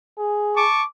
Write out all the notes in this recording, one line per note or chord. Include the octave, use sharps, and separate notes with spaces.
G#4
A5 C#6 D6